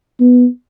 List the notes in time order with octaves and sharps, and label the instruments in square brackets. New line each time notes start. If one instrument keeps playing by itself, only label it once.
[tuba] B3